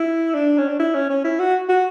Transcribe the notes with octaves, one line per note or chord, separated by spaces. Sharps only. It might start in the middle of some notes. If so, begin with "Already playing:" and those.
Already playing: E4
D4
C#4
D4
E4
C#4
C#4
E4
F#4
F#4